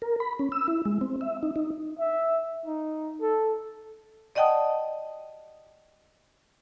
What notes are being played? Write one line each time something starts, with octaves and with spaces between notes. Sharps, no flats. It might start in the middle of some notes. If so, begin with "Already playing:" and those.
A#4
B5
C#4
E6
E4
G#3
C4
E5
D#4
D#4
E5
D#4
A4
D5 D#5 F#5 G5 A5 D#6